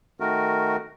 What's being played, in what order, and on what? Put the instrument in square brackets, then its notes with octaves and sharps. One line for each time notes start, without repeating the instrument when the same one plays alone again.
[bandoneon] D#3 A3 F#4 A#4